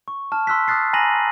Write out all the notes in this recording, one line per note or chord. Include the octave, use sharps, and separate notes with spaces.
C#6
A5 F6
C6 E6 F#6 B6
D#6 F6 F#6 A6 C7
G#5 A#5 B5 A#6 D#7 F#7